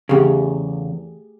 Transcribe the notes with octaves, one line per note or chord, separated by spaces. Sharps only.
E2 C#3 A3 G4 G#4